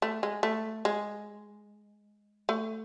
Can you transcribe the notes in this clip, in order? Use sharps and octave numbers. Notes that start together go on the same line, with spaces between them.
A3
G#3
A3
G#3
A3